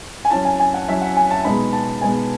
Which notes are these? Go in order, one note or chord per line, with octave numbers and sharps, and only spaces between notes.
G#5
F#3 C#4 E4 A5
G#5
G#5
F#5
F#3 C#4 E4 E5
F#5
G#5
A5
B2 G#3 B3 D#4 B5
A5
B2 G#3 B3 D#4 G#5